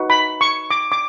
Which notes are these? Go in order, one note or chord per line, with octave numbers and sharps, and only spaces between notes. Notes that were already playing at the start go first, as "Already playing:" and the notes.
Already playing: D#4 F#4 B4
B5
C#6
D6
D6